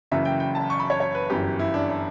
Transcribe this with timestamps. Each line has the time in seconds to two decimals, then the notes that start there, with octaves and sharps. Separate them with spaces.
0.11 F#1 F#2 C#3 E3 E5
0.25 G5
0.40 G5
0.55 A5
0.70 C#6
0.80 B5
0.90 C#5
1.00 C#5
1.15 B4
1.30 G1 F#2 E3 G4
1.59 E4
1.74 D4
1.89 D4